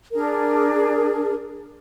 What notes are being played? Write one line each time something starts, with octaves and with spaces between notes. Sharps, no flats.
D4 G#4 A#4